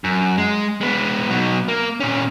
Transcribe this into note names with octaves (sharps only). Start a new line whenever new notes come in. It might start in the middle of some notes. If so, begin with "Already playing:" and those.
F#2
G#3
G#3 B3
B2 F#3
A#3
A#2 C#4